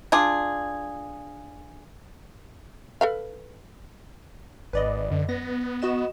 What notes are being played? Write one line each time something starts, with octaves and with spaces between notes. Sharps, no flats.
D4 F4 G#4
A4 B4 F5
G#1 B4 D5 D#5
F#2 D3
B3 A#6
F#4 D#5 E7